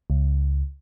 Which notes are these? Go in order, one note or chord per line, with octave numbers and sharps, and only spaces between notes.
C#2